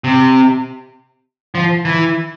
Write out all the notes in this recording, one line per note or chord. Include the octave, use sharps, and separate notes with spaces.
C3
F3
E3